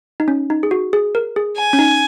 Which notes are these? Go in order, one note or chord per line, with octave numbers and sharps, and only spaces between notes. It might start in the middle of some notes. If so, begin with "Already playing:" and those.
D#4
C#4
D#4
G#4
F#4
G#4
A#4
G#4
G#5
C#4
D#4